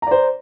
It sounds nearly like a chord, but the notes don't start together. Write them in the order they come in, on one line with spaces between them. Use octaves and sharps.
A#5 D5 C5